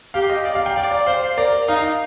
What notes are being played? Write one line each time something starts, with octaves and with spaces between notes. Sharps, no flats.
G4 F5
D#5
D5 F5
F5
G5
D5 F5
D5
C5 F5
A#4 D5
D#4 F5